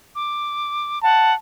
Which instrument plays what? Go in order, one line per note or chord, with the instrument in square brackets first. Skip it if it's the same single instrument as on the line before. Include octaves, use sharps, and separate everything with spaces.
[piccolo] D6
[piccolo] F#5 [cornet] A5